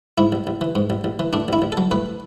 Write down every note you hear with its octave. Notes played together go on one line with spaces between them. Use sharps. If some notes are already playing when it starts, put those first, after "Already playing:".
G#2 E4
A1
A1
E3
G#2
A1
A1
E3
A2 D4
A1 E4
A1
A4
F#3
A2 B4